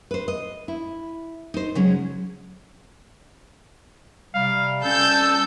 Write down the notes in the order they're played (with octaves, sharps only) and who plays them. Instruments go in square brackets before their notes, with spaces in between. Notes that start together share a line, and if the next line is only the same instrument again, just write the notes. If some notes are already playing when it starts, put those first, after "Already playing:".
[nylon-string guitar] B4 C5
D#5
E4
D#4 C5
C#3 F#3 G#3 C#4
[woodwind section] C3 G3 [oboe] F5
[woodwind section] G3 C#4 [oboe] A4 [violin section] A5 E6 G6